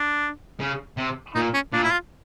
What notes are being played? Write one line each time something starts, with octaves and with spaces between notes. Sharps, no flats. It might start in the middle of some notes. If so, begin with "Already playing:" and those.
Already playing: D4
C#3
C3
A#2 D#4
C#4
A#2 D4
E4
F4